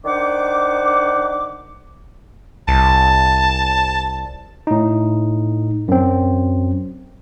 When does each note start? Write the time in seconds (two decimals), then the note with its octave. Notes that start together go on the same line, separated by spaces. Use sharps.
0.04 D#3 D4 C5 F#5 D6
2.68 C2 A5
4.67 A2 D#4
5.88 F#2 C4